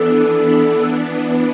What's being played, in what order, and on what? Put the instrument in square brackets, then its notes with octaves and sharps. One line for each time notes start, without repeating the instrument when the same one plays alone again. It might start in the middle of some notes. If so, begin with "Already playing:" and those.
Already playing: [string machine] E3 B3 D4 [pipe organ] A4